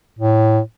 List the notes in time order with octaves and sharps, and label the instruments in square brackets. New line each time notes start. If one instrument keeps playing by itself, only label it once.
[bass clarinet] A2